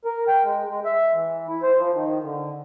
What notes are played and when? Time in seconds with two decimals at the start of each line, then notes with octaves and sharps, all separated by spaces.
0.05 A#4
0.28 G5
0.44 G#3
0.68 G#3
0.85 E5
1.13 E3
1.48 E4
1.63 C5
1.78 F3
1.93 D#3
2.23 D3